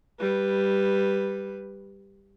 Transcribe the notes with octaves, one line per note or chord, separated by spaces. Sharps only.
G3 B4